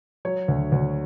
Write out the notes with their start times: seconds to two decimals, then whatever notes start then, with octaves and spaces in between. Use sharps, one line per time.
0.25 F#3 C#5
0.48 D2
0.72 D2